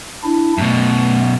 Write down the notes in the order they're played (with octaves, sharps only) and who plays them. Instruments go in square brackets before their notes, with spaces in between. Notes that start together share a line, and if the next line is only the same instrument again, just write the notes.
[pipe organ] D4 E4
[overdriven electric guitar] F#2 B2 [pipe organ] A3